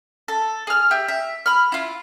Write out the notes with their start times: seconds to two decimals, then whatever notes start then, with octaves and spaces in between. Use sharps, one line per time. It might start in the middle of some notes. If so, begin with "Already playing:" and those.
0.28 A4
0.67 G#4 F6
0.91 G4 E5 E6
1.08 E5
1.46 B5 F6
1.72 E4 F4